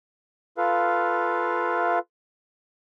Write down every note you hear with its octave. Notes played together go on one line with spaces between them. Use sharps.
F4 A4 B4 F5